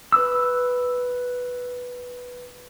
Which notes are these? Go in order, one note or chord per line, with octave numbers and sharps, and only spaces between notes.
B4 E6